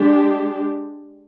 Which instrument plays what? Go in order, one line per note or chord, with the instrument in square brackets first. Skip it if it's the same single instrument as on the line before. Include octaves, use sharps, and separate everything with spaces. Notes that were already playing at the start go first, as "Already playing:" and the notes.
Already playing: [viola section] G#3 D4 G4